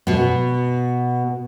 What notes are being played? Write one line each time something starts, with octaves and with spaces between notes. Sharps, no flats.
B2 B3